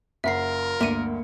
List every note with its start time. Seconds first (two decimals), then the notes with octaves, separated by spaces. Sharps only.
0.24 F#1 F4 A#4 E5 F#5 C7
0.80 G1 D2 A#3 E5 C#7 D#7